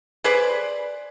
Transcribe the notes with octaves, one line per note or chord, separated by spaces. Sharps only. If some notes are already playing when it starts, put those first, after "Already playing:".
G#4 B4 C5 D5